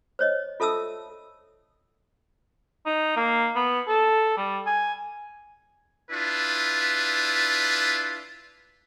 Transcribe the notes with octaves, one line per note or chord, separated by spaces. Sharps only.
C5 C#5 D#5
F4 A4 E5 A5 D#6 E6
D#4
A#3
B3
A4
G3
G#5
D4 E4 F4 B4